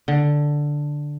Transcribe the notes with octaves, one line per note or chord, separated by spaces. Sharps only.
D3